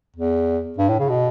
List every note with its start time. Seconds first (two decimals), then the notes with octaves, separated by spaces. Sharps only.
0.16 E2
0.78 G2
0.89 A2
0.99 C#3
1.09 B2